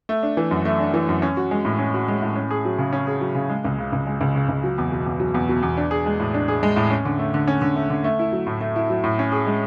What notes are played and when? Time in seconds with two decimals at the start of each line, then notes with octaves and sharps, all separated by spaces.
0.09 A3
0.23 D4
0.37 E3
0.51 F#2
0.65 A3
0.80 D4
0.94 E3
1.09 F#2
1.22 C#4
1.37 F#4
1.51 G#3
1.65 A2
1.79 C#4
1.94 F#4
2.08 G#3
2.22 A2
2.36 C#4
2.51 G#4
2.65 F#3
2.78 C#3
2.93 C#4
3.07 G#4
3.21 F#3
3.35 C#3
3.49 G#3
3.65 C#2
3.79 C#3
3.93 C#2
4.07 G#3
4.21 C#2
4.35 C#3
4.49 C#2
4.64 F#3
4.78 E2
4.92 B2
5.06 E2
5.20 F#3
5.34 E2
5.49 B2
5.63 E2
5.77 D4
5.91 G#4
6.06 G#3
6.20 A2
6.34 D4
6.48 G#4
6.63 G#3
6.76 A2
6.91 C#4
7.05 D3
7.19 A3
7.34 D3
7.48 C#4
7.62 D3
7.76 A3
7.90 D3
8.04 A3
8.19 E4
8.32 F#3
8.47 A2
8.61 A3
8.76 E4
8.90 F#3
9.04 A2
9.19 C#4
9.32 G#4
9.46 G#3